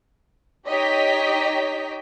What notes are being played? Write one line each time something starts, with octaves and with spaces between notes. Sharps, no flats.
D#4 G4 C#5 D#5 G5 B6